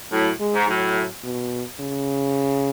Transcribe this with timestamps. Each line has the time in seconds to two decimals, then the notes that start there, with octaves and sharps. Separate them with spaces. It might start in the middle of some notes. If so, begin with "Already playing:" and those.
0.12 A2 F#3
0.40 G#3
0.54 G#2
0.68 A2 F#3
1.24 B2
1.80 C#3